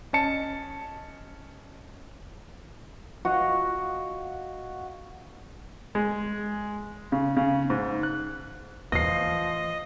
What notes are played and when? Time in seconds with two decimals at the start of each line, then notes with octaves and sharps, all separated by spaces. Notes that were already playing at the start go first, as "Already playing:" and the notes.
0.13 C#4 D#5 A5 C#7
3.25 F#4 D#5 F5
5.95 G#3
7.12 C#3
7.37 C#3
7.70 G#2
8.03 F#6
8.92 E3 F3 A3 D#5 A#6 C7